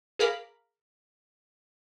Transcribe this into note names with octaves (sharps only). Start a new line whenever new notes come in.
G#4 A#4 F5 B5 D6